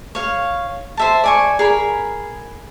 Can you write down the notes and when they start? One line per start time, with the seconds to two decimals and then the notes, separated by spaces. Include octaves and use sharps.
0.15 C#5 F5
0.97 C5 E5 A5
1.24 D5 G#5 C#6
1.59 G#4 A#4 B5